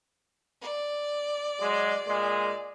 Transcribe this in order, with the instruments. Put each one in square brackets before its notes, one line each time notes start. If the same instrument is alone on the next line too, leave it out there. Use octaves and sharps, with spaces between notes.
[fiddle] D5
[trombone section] F#3 G#3
A#2 G#3